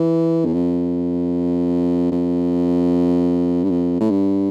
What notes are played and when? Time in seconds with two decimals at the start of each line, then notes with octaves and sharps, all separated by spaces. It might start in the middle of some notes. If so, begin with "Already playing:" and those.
Already playing: E3
0.45 E2
0.53 F2
2.12 F2
3.64 G2
3.70 F2
4.00 A2
4.10 G2